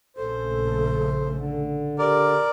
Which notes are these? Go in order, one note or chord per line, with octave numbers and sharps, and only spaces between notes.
A#1 C#3 A3 A4 C5
D3
G4 A#4 D5